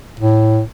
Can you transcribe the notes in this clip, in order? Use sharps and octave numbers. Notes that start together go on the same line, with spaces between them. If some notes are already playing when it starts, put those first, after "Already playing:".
A2